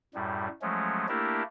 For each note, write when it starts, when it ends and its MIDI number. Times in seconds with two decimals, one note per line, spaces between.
0.14 0.48 42
0.14 0.48 45
0.14 0.48 55
0.62 1.06 53
0.62 1.06 54
0.62 1.06 56
0.62 1.06 57
0.62 1.06 61
1.08 1.43 57
1.08 1.43 58
1.08 1.43 62
1.08 1.43 64
1.08 1.43 67
1.08 1.43 70